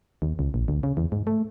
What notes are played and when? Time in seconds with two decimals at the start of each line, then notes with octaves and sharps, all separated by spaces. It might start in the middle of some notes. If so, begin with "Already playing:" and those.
0.22 D#2
0.39 C#2
0.54 A#1
0.68 D2
0.83 C#3
0.97 E2
1.12 G#2
1.27 A3